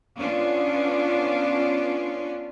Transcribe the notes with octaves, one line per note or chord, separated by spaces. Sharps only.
B3 C#4 D4 F4